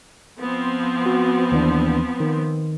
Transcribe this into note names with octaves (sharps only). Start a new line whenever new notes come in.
F3 B3 C4
F#4
D#2 E3 D4
D#3